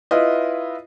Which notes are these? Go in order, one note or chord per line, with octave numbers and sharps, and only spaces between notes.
E4 F4 B4 D#5